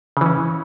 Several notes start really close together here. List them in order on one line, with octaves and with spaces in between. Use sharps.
C#3 E3 C#4